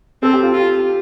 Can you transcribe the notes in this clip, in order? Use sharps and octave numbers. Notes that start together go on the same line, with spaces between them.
C4 A4
G4
F4
F4